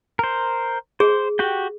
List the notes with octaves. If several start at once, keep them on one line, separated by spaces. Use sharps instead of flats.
A#4 C5
G#4 C5
F#4 G4 G5